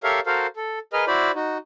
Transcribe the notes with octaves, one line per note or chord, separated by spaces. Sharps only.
G4 A4 A#4 C#5 E5 F5
F#4 A4 A#4 C5 F5
A4
G#4 A#4 B4 D#5 F6
E4 F#4 C5 D5 B5
D#4 F#4